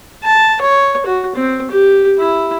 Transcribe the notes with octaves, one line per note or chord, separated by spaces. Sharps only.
A5
C#5
F#4
C4
G4
E4